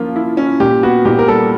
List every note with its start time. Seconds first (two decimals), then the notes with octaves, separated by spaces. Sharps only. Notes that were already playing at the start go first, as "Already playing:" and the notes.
Already playing: F3 A#3 C#4 F4
0.16 E4
0.37 C#4
0.60 A#2 G4
0.83 B3 F#4
1.05 A#2 G4
1.19 A#4
1.28 G3 A4